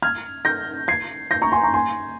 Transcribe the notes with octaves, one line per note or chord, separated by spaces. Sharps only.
F6 G#6
G6 A#6
G#6 C7
G6 A#6
A#5 C#6
G#5 C6
A#5 C#6
G#5 C6